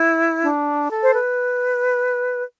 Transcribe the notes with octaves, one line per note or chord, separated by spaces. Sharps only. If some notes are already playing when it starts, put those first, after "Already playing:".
Already playing: E4
D4
A4
C5
B4